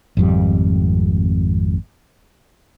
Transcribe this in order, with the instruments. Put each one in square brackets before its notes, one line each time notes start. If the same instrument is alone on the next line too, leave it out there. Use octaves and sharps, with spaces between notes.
[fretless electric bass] G#1 F2 G3